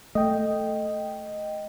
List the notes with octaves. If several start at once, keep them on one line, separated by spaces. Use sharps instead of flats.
A3 D#5 G5